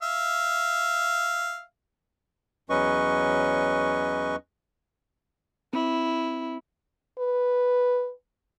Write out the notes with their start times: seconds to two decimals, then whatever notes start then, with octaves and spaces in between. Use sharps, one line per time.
0.03 E5 F5
2.70 E2 F#3 C#4 B4 D#5 C#6
5.73 C4 E4
7.19 B4